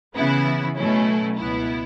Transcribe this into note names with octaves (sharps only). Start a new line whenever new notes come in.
C#3 E3 B3 E4
B2 F#3 A3 C#4 E4
C#2 B2 B3 E4